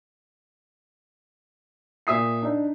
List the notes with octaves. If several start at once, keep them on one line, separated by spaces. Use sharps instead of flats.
A#2 E5 D#6 C7
D4 D#4